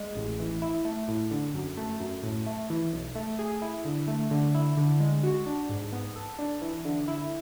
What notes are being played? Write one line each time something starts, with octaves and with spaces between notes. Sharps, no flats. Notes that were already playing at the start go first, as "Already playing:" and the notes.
Already playing: G#3
A1
E3
E4
A3
A2
D3
F#2
A3
F#2
A2
A3
E3
B1
A3
G#4
E4
D3
A3
D3
E4
D3
G#3
F#4
D4
G#2
B3
A4
D4
E3
D3
E4